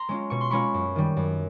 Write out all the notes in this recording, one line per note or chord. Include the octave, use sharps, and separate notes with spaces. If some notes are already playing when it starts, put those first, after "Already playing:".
Already playing: A#5 C6
G#3 C#4 F4
B2 C#6
C6
G#3 C#4 F4 B5 C#6
F#2
D#3 G3
F#2